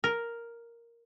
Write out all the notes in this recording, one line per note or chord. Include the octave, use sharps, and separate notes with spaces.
A#4